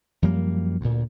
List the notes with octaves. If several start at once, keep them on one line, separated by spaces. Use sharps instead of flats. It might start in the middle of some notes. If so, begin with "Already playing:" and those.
F#2 F3 G3 A#3
D2 A#2